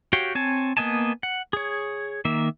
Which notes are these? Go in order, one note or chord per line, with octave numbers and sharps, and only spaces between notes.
F#4 G4 C#5 F5 G5
C4 C#5 G#5 A5
A#3 B3 D#5 G#5 A5
F#5
G#4 C#5
D#3 A#3 E5